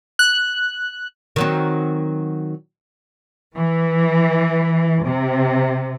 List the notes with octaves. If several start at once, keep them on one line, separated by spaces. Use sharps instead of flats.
F#6
D#3 F#3 C4
E3
C3